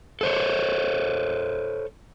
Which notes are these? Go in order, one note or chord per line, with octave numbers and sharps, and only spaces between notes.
A4 C5 C#5